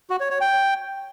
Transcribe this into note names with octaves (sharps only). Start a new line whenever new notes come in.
F#4
C#5
C#5
G5